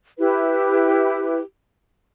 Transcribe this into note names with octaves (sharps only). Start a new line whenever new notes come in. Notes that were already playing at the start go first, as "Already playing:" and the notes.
E4 G4 B4